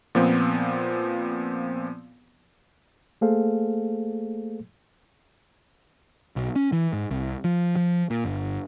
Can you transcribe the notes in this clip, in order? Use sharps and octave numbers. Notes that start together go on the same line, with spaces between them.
A#2 F3 B3 C4
A3 A#3 G#4 A4 C5 F5
B1
C#4
E3
G#2
C2
F3
F3
A#2
G1